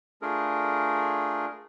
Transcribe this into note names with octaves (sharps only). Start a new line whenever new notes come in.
A3 D4 F4 G#4 A#4